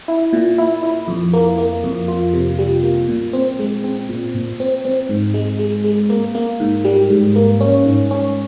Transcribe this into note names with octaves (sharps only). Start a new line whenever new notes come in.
E4
A#2
E4
E4
F2
A#3
A#3
F2
F4
C3
G3
A#3
A#2
C4
G#3
C4
A#2
A#2
C4
C4
G#2
G#3
G#3
G#3
A#3
A#3
G#2
G3
G#2
A#3
C#4
G#2
C#4